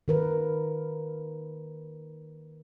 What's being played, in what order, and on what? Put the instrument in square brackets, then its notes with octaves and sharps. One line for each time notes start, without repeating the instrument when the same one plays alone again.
[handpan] D#3 A#4 B4